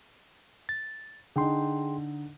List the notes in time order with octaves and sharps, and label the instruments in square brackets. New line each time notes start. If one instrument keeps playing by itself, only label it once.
[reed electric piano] A6
[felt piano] D3 D#4 [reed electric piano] G#4 G5 C6